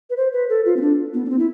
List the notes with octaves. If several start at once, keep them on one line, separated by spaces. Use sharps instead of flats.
B4
C5
B4
A4
F4
C4
D4
B3
D4
C4
E4